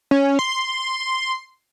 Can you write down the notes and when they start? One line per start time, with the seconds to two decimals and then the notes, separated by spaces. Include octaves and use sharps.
0.11 C#4
0.39 C6